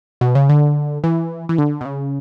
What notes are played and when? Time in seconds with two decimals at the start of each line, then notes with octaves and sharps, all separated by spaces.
0.21 B2
0.35 C#3
0.49 D3
1.04 E3
1.49 E3
1.58 D3
1.81 B2
1.85 C#3